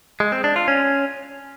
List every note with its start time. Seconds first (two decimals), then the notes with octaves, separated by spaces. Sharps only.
0.20 G#3
0.32 C4
0.44 D4
0.56 F4
0.68 C#4